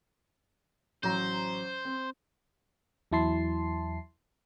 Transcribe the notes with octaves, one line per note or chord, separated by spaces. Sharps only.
A1 F#3 C5 A#5
C4
E2 F#3 E4 A5 C6 C7